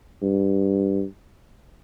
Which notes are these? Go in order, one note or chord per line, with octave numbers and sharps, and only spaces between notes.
G2